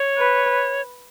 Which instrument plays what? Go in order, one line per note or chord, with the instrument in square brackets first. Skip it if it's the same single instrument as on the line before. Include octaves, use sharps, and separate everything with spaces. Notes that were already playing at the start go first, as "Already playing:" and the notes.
Already playing: [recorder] C#5
[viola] B4